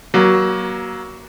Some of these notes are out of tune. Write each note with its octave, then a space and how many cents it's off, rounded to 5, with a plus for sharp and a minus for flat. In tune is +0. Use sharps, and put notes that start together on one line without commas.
F#3 +20 A#3 +30